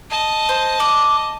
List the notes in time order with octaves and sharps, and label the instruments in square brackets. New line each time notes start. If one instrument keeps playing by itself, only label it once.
[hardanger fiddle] D#5 A5
[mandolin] C5
D5 D6